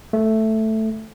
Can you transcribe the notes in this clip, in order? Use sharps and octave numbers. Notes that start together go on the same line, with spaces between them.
A3